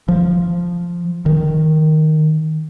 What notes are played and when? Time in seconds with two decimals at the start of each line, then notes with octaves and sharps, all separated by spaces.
0.08 F3
1.26 D#3